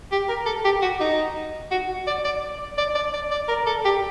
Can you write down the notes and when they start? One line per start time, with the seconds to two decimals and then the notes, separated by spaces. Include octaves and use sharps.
0.12 G4
0.29 A#4
0.46 A4
0.65 G4
0.82 F#4
1.01 D#4
1.71 F#4
2.07 D5
2.25 D5
2.78 D5
2.95 D5
3.14 D5
3.31 D5
3.48 A#4
3.66 A4
3.85 G4